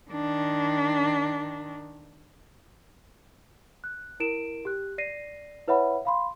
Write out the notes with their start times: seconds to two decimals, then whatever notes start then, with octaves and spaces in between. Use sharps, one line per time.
0.11 D#3 D4
3.84 F#6
4.20 E4 A#4 D7 E7
4.65 G4 F#6
4.98 D5 A#6 C7 D#7
5.68 E4 B4 C#5 E5 F#5 B5
6.05 F5 B5 C6